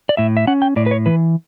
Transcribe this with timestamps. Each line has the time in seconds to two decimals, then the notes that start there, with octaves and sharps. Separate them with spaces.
0.09 D5
0.17 A2 E5
0.37 E5
0.47 C#4 F#5
0.62 G5
0.76 A2 D5
0.86 B4
0.91 C#5
1.06 E3 B4